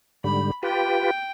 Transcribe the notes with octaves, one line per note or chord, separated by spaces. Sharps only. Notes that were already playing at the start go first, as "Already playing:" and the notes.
G#2 D3 G3 B5
F4 G4 B4 G5